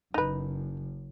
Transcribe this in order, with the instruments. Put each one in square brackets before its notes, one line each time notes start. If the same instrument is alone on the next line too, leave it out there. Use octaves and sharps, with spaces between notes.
[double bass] F#1 F#2 [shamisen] D#4 B4